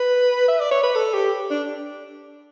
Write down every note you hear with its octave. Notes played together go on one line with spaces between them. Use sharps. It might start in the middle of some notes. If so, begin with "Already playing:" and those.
Already playing: B4
E5
D5
C#5
B4
A4
G4
D4